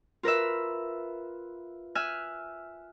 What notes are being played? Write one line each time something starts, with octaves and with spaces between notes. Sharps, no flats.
F4 A#4 B4 E5
E5 G#5 F6 F#6